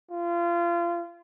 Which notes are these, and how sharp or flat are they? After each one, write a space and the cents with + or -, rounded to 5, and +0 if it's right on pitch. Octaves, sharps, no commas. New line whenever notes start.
F4 -30